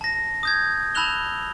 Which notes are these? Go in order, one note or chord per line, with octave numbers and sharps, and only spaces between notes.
A5 A#6
D#6 G6 G#6
A5 B5 E6 F#6 F7 G7